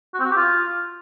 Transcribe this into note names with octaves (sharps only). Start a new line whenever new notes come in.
F#4
C4
F#4
G4
F4